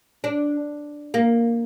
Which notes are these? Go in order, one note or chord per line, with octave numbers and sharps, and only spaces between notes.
D4
A#3